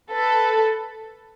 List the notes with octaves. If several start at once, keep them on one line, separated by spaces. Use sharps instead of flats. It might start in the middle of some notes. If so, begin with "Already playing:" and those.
A4 B4